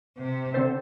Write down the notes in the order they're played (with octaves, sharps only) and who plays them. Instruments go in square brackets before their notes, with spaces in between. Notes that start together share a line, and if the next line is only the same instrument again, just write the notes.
[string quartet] C3
[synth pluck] D3 C4 A4 C5